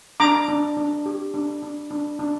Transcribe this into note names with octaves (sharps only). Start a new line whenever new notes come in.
D4 A#5 D6
D4
D4
G4
D4
D4
D4
D4